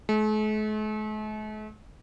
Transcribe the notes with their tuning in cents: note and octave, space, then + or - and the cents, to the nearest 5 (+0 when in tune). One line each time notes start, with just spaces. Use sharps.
A3 -45